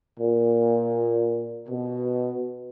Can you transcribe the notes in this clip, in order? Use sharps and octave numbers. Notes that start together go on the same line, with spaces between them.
A#2
B2